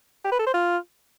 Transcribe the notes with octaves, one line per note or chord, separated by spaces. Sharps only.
G4
B4
A4
C5
F4